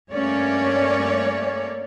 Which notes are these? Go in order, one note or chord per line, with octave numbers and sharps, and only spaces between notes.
G2 A3 A#3 C#4 C#5 D5